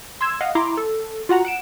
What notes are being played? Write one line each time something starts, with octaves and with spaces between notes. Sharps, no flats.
C6 E6 G#6 E7
D#5 F5 F#5
E4 A#5 C6 D6
A4
F4 F#4 F#5 A#5
F#5 D7 E7